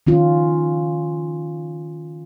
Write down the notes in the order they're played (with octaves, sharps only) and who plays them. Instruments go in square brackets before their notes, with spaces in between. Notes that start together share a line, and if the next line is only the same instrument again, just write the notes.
[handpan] D#3 C#4 F4